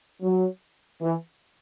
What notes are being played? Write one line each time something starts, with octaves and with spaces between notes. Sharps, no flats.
F#3
E3